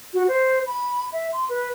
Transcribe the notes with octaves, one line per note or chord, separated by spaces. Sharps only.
F#4
C5
B5
E5
C6
B4